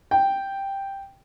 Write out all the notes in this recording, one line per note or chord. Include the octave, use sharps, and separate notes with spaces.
G5